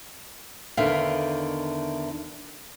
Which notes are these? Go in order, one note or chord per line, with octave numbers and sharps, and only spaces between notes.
E2 D3 D#3 E5 F5